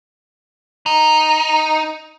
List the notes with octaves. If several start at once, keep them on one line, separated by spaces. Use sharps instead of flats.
D#4